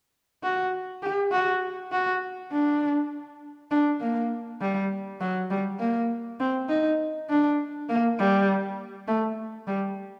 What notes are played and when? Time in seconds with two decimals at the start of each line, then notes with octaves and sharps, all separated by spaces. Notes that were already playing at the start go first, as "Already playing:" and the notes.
0.43 F#4
1.02 G4
1.32 F#4
1.92 F#4
2.52 D4
3.71 D4
4.01 A#3
4.61 G3
5.21 F#3
5.50 G3
5.79 A#3
6.40 C4
6.69 D#4
7.29 D4
7.89 A#3
8.19 G3
9.08 A3
9.67 G3